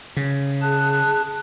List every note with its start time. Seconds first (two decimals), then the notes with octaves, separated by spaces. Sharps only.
0.17 C#3
0.61 G#4 A5 F#6